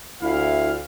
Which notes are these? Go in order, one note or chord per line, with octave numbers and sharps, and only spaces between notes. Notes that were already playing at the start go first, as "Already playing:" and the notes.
D2 E4 F5